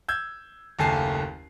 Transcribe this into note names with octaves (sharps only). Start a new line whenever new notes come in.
E6 G6 G#6
F#1 D#2 A3 G#5 A5 C7